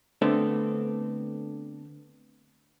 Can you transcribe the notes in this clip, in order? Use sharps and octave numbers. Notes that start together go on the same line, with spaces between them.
D3 A3 B3 C4 D4 A4